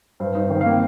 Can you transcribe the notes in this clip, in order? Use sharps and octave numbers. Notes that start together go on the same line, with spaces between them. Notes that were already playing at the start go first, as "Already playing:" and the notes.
G2 C5
D#4 C5
D#3 C5
F5
A#3
G5